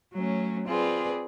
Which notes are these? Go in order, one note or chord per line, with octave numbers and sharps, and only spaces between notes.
F#3 A3 C#4
C4 F4 G#4 B4 D5